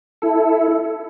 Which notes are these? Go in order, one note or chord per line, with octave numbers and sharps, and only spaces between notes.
E4 A4